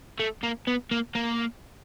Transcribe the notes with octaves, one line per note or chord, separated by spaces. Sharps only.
A3
A#3
B3
A#3
A#3